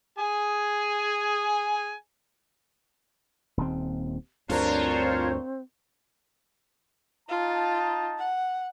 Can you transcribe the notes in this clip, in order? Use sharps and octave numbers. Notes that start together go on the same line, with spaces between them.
G#4 G#5
D#1 D#2 C4
D2 G2 C4 D4 F4 A#4 C5 C#5
D#4 F4 A5
F#5